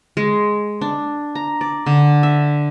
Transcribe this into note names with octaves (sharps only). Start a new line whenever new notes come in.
G#3
D4
A#5
D5
D3
E5